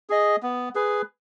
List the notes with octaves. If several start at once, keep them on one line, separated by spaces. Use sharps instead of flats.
G#4 D#5
B3
G#4 B4